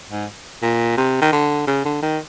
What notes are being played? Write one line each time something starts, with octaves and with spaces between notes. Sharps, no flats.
G#2
A#2
C3
D#3
D3
C#3
D3
D#3